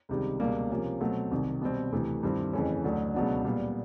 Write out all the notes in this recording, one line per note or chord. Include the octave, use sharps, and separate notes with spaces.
C#2 C3 D#3 G3
C#2 B2 G3 A#3
C3 F3 A#3 C#4
B2 F#3 A3 C4
C2 C3 D#3
B2 G3 C4
D2 C3 E3 A3
G2 D#3 G3 C4 E4
F2 C#3 E3 A3 C#4
D2 D3 F#3 A3 D4
C#2 B2 F#3 B3 D4
A#2 G3 B3